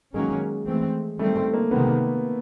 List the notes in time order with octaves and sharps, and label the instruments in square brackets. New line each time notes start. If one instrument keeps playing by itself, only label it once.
[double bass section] D#3 F#3 A#3 C#4 [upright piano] G#3
[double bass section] E3 A3 C4
[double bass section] D#3 G3 C4 [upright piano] A3
[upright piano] A3
A#3
[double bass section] C3 D#3 G#3 [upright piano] B3